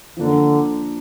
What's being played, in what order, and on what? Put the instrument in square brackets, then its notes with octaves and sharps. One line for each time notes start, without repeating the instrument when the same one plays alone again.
[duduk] D3 [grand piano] F3 A#3 D4